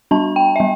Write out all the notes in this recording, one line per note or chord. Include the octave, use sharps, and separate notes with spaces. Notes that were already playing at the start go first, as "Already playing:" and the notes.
G3 D4 A5
G5
E5
G3